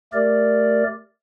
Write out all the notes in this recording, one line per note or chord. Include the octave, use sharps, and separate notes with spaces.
A3 G4 A#4 D5